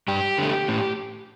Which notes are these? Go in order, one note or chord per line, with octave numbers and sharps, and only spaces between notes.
G2 G4
D3 A3
A2